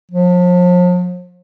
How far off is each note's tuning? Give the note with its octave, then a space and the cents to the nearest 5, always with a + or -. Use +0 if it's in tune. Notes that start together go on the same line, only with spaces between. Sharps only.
F3 +40